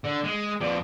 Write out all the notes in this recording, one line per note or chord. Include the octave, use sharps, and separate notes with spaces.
D3
G#3
F2 D5